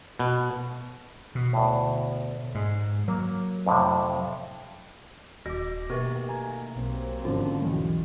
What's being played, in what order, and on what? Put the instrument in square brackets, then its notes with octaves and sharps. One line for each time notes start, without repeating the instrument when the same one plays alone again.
[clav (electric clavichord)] B2
[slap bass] B2
[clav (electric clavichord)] D2 A2
[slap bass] G#2 [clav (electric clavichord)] G#3
[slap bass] F#3 [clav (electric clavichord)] A#3
[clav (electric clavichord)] F2 A2 C3
[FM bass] D#1 [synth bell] F#4 D6 [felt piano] A#6
[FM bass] B2 [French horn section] D#3 A3 A#3 [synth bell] G4 A#4 B4 [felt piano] C#6
[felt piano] G#5 A#5
[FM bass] B1 [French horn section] F#3 A#3 C4
[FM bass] G#1 [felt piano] D3 F3 [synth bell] C#4
[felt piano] B1 E2